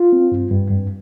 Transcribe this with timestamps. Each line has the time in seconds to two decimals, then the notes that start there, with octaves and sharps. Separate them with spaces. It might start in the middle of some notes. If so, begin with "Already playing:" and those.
Already playing: F4
0.13 C4
0.32 G2
0.51 G2
0.70 G2